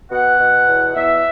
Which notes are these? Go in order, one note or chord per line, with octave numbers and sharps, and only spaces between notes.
B2 F#5
B2
E2
E2 E5